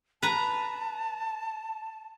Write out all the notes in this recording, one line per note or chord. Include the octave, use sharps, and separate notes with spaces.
B4 A5 A#5